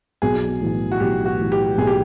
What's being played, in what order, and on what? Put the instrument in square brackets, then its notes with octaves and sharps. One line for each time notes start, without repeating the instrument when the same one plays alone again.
[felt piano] B1 [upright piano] G#4
[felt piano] A2 E3
[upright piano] F#4
[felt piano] B1 [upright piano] G4
[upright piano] F#4
[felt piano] A2 E3
[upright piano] G4
[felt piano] B1 [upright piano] G#4
[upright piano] G4